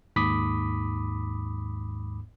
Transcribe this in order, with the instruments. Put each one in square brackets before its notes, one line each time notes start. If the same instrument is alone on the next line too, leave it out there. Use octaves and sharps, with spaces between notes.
[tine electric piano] D#2 G#2 B5 D6 D#6 B6